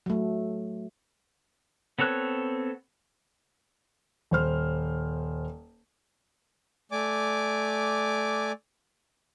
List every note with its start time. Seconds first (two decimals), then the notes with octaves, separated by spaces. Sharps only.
0.06 F#3 A3
1.99 B3 C4 A4 C#5 F#6
4.31 D#1 C5 F6
6.92 A3 D5 G#5 D6